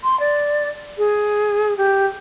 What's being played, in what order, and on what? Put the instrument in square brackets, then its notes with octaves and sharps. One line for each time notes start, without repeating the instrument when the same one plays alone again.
[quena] C6
D5
G#4
G4